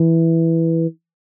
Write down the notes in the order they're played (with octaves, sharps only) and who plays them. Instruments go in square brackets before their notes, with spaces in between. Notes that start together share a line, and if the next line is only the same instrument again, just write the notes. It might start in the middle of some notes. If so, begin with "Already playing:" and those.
Already playing: [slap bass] E3